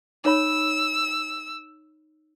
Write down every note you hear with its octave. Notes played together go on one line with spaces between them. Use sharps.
D#4 C#5 B5 E6